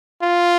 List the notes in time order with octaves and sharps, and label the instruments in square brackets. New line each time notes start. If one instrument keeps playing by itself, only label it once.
[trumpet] F4